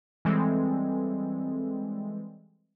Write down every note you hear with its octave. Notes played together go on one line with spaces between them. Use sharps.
E3 G3 G#3 C4 A4